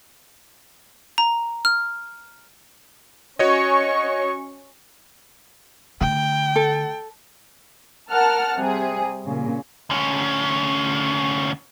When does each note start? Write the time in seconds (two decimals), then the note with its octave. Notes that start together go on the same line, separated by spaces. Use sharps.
1.18 A#5
1.65 F6
3.39 C#4 F#4 C#5 D#5 C#6
6.01 D3 A3 G5
6.56 A4
8.10 A#4 F#5 A5 F6
8.55 C3 G3 G#4
9.25 A#2 C#3
9.90 D2 C#4